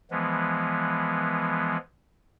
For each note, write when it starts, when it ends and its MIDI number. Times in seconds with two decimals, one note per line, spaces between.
0.11 1.77 52
0.11 1.77 53
0.11 1.77 56
0.11 1.77 59